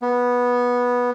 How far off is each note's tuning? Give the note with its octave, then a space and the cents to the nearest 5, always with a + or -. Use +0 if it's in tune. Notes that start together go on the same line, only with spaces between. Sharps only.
B3 -10